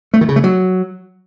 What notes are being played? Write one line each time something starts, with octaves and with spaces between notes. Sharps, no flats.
A3
D#3
C#3
A3
F#3